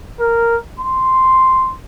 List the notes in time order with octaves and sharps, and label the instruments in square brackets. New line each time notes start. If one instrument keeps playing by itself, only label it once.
[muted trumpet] A#4
C6